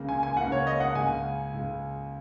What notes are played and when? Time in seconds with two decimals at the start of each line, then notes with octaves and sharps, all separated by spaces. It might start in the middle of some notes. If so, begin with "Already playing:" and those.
Already playing: C#2 C#3 A#3
0.09 G#5
0.23 G#5
0.37 C#2 C#3 A#3 F#5
0.52 C#5
0.67 D#5
0.80 F#5
0.95 C#2 C#3 G#3 G#5
1.54 C#2 C#3 G#3